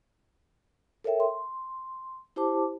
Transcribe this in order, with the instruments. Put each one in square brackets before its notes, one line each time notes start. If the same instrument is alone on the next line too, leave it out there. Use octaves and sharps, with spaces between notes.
[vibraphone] A4 A#4 C#5 E5 G5
C6
E4 G4 C5 A5 D6